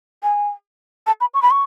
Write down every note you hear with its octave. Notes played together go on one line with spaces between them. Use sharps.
G#5
A5
B5
C#6
B5
C#6